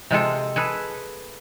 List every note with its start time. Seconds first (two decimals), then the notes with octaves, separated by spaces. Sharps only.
0.11 C3 G#3 F4 A4
0.56 G#4 A4 B4